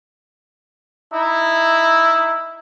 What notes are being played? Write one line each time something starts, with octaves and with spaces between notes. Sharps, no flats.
D#4 E4